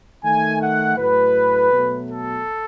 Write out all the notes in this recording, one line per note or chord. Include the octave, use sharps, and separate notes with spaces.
D#3 A3 G#5
F#5
A2 F#3 A3 B4
B2 F#3 A3
A4